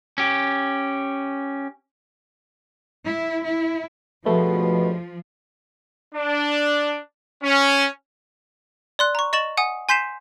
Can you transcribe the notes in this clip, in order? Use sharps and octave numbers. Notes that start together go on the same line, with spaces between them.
C#4 G4
E4
E4
C#2 G2 B2 F3 A3
D4
C#4
D5 C6 F#6
A#5 C#6
D#5 C#6 A6 E7 F#7
F#5 G#5 D#6
G#5 C6 G6 B6 C7 E7